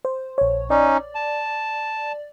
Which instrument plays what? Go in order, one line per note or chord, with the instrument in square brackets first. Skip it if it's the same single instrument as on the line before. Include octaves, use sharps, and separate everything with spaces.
[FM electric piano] C5
A#1 C#5
[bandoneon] C#4 D#4 [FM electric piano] D5
[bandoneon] A5